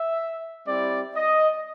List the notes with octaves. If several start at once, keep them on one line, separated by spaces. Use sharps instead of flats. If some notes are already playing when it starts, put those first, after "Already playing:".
Already playing: E5
G3 C4 E4 G4 D5
D#5